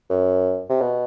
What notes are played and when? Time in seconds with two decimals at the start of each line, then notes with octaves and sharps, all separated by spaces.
0.10 F#2
0.70 C3
0.81 B2